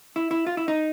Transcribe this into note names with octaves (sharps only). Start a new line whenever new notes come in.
E4
E4
F4
E4
D#4